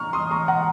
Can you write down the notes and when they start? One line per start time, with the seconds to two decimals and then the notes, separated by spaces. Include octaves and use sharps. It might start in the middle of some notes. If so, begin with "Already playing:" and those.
Already playing: A#5 C#6 F6
0.13 C6 D#6
0.31 A#5 C#6
0.48 F#5 A#5